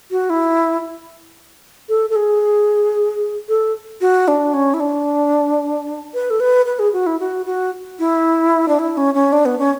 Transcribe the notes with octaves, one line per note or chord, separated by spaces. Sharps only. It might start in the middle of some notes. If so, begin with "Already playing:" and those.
F#4
E4
A4
A4
G#4
A4
F#4
D4
C#4
E4
D4
B4
A4
B4
B4
G#4
F#4
E4
F#4
F#4
E4
D4
E4
C#4
C#4
D4
B3
C#4